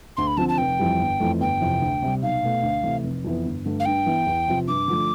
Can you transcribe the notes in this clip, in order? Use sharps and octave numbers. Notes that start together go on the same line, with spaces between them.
D2 C6
B5
D3 F3 C4 A5
A5
F1 G5
F2 E3 G3
G1
F2 E3 A3
G1 G5
F2 C3 E3
D2
C3 G3
B1 F5
B2 A3
D2
C3 E3 A3
F1
F2 E3 B3
G1
G2 D3 A3
F5
G2 G5
E3 B3
E2
C3 F3
G2 D6
D3 F3 A3 D4